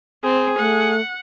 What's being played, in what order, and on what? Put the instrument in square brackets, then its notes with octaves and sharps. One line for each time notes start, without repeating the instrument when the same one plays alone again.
[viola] C4 [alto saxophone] G#4
[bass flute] A3 [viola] F#5